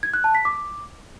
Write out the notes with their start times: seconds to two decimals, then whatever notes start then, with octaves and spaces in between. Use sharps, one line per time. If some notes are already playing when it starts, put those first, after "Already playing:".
0.03 G#6
0.14 F#6
0.24 A5
0.35 B6
0.45 D6